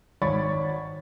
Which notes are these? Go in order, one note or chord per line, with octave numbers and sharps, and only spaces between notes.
G#1 C#5 D5 B5 C#6 A6